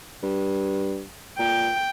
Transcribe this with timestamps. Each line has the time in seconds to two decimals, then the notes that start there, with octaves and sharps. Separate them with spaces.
0.23 G2
1.39 A#2 G5